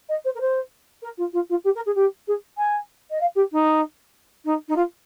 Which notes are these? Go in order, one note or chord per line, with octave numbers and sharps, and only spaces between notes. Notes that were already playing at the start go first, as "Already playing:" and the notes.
D#5
C5
A#4
C5
A#4
F4
F4
F4
G4
A#4
G#4
G4
G#4
G#5
D#5
F5
G4
D#4
D#4
D#4
F4